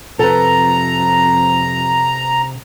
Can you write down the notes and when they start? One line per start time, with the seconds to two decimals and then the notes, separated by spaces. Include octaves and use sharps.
0.19 F2 C3 A4 B4 A#5